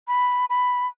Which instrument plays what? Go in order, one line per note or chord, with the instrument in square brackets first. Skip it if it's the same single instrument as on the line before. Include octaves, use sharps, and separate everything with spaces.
[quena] B5
B5